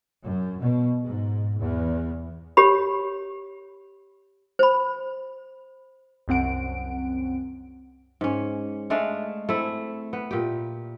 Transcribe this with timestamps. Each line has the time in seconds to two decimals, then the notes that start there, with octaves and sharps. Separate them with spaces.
0.21 F#2
0.59 B2
1.04 G#2
1.60 E2
2.57 G4 C#5 B5
4.59 C5 B5
6.28 C2 F#2 C4 F#5 D7
8.21 G#2 C#4
8.90 G#3 A3 D4 F5
9.49 A3 C4 E4
10.13 B3
10.31 A#2 G4